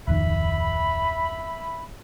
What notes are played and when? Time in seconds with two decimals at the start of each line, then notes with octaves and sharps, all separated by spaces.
0.07 D1 F2 D#3 E5 B5